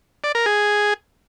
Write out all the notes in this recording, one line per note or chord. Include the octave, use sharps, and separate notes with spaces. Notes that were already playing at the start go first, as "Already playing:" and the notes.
D5
A#4
G#4